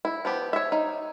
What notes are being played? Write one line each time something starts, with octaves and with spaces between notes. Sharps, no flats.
E4
F3 B3 G4
C#5 E5
D#4